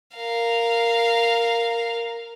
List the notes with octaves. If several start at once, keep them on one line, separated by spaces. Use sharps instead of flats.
A#4 F5